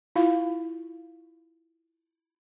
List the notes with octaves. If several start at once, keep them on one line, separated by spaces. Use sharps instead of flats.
E4 F4 F5